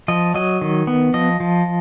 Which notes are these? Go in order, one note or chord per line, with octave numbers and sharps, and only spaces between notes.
F3 D#5
F#3 D#5
D#3
B3
F3 D#5
F3